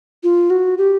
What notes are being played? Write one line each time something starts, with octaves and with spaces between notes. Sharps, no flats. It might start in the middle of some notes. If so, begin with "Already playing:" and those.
F4
F#4
G4